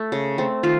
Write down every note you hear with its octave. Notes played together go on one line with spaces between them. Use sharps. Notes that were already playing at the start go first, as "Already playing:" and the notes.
Already playing: A3
C#3
A3 C4
D#3 F4